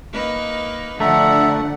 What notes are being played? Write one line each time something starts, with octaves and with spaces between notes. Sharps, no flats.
A#3 D#4 B4
D3 F3 A3 D5 E5 F#5 A#5